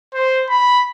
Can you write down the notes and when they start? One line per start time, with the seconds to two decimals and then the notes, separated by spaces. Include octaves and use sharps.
0.14 C5
0.49 B5